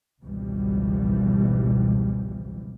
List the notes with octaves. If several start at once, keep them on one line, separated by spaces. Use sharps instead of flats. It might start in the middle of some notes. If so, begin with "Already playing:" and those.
G#1 C#2 B2 E3 F3 G3